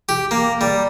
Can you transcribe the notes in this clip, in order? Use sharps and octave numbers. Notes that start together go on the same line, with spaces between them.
G4
A#3
G3